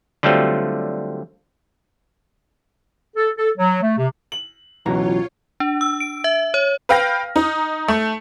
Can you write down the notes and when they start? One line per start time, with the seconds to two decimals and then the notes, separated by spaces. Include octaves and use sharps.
0.23 D3 F#3 G3 A3 C4 F4
3.16 A4
3.38 A4
3.58 F#3
3.82 A3
3.98 C3
4.32 F#7
4.86 C#2 F#2 B2 E3 F#3 F4 C#5 A#5
5.60 D4
5.81 E6
6.00 D7
6.24 E5
6.54 C#5
6.89 B4 F5 G5 F6 A#6
7.36 D#4
7.88 A3